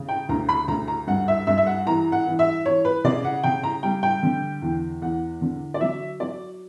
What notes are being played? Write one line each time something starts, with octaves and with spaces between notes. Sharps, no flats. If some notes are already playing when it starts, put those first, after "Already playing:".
Already playing: C#3
G5
D2 A#5
B5
D2 A#5
A#5
G2 F#5
E5
G2 E5
E5
F#5
E3 A#5
F#5
E3
E5
E3 C#5
B4
C#3 D5
F#5
C#3 G5
A#5
G3 G5
G5
D3
E2
E2 F#5
D3
D5
F#3 E5
F#3 D5